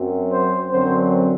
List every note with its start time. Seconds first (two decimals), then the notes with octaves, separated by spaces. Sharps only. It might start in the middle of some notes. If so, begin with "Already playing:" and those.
Already playing: F#2 F#3 C4
0.32 C5
0.71 F#2 D3 F#3 C4 C5